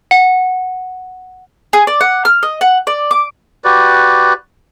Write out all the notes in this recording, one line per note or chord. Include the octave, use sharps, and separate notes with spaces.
F#5
G#4
D5
F#5
F6
D#5
F#5
D5
D6
F#4 G4 B4 D5